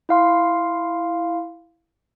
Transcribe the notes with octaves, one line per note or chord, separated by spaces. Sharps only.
E4 F5 C6